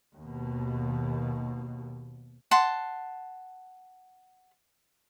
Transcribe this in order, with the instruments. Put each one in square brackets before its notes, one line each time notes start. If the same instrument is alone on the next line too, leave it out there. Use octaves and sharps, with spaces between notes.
[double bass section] D#2 B2
[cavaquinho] F#5 A5 C6